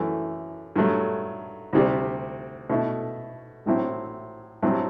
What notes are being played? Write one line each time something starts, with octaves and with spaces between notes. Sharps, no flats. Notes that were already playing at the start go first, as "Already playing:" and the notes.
Already playing: F#2 E3 A3
G2 F#3 A3
D2 C3 G3
B2 A3 E4
A1 A2 F#3 C4 E4
A1 G2 F#3 C4 E4